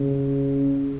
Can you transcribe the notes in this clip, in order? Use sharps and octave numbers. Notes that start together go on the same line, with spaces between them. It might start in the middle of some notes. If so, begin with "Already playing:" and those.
Already playing: C#3